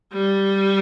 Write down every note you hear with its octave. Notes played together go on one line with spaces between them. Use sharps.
G3